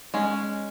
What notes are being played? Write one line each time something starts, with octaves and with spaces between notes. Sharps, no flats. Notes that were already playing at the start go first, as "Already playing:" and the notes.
G#3 C#4